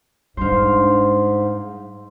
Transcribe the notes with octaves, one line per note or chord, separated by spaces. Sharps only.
G#2 G3 D4 C5 F5